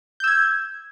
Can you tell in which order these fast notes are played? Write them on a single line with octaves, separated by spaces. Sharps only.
G6 E6 G#6